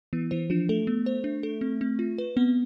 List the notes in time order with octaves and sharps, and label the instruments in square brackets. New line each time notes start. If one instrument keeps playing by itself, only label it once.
[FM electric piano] E3 [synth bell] B3
[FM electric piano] E3 [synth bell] C5
[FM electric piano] F3 [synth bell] D4
[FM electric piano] A3 [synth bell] A4
[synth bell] B3
C5
D4
A4
C4
C4
F4
B4
[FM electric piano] B3 [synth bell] C4